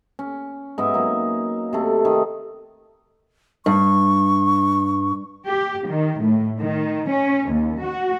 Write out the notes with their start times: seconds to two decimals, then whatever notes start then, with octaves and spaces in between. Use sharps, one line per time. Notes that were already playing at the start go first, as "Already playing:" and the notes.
0.19 C#4
0.78 G#2 B3 D#5 E5
0.94 F#3 A#3
1.73 C3 A3
2.05 D#3
3.66 G2 C#6
5.48 G4
5.90 D#3
6.21 A2
6.60 D#3
7.09 C#4
7.51 D#2
7.83 F#4